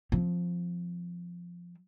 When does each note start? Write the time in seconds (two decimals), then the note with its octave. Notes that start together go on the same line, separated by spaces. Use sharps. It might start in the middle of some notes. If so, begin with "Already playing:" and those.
0.12 F3 C4